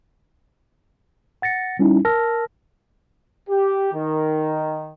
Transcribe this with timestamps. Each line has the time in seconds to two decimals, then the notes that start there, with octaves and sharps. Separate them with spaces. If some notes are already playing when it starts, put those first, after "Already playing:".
1.42 F#5 A6 A#6 C#7
1.79 G3 C#4 D#4 E4
2.05 A#4 A5 E6 F6 A#6
3.49 G4
3.93 D#3